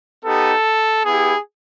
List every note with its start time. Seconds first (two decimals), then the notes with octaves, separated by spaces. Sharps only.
0.24 B3 D#4 G4 A4
1.04 B3 E4 G4 G#4